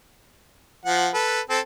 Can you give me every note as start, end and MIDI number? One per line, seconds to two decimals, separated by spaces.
0.86 1.09 53
0.86 1.09 78
1.14 1.40 69
1.14 1.40 71
1.50 1.60 60
1.50 1.60 69